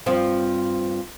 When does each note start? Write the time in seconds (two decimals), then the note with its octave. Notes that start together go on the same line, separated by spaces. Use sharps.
0.06 G2 F3 C4